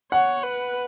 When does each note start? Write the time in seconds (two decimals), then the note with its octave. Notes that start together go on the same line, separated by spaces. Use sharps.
0.12 C#5 F#5
0.43 B4